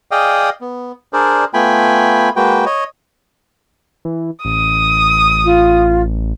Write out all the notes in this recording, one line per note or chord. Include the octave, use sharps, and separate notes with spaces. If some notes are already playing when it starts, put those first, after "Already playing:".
G#4 D5 D#5 F5 G5 D#6
B3
D4 G#4 A#4 C5 D5
A3 B3 F4 G5 G#5 B5
G#3 A#3 F#4 B4 G5
C#5 D#5
E3
A1 D#6
F4